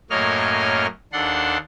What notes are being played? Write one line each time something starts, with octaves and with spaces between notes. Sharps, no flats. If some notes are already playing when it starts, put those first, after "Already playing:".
F#2 A2 A#3 C#5 D#5 F6
D#2 D4 A4 F#5 C6